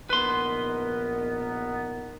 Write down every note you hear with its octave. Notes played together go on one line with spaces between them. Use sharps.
A#1 B3 D#4 A#4 B4 C6